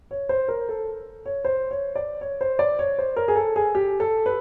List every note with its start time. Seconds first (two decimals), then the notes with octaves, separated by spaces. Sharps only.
0.11 C#5
0.29 C5
0.48 A#4
0.69 A4
1.26 C#5
1.45 C5
1.71 C#5
1.96 D5
2.21 C#5
2.41 C5
2.59 D5
2.79 C#5
2.99 C5
3.16 A#4
3.28 G#4
3.36 A4
3.56 G#4
3.75 G4
4.00 A4
4.26 B4